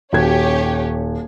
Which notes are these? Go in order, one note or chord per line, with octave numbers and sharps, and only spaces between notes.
D#1 C#4 F#4 G4 C#5 G#6